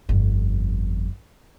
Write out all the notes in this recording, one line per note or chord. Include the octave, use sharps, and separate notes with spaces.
G1 F2